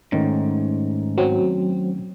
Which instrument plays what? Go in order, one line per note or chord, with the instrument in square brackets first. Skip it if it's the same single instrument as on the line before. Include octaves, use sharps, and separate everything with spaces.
[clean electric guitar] G#2 [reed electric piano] D#3 A3 C#4
[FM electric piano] F#3 C4